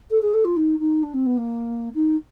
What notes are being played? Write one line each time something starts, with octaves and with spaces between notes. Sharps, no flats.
A4
G#4
A4
F4
D#4
D#4
D4
C4
B3
A#3
D#4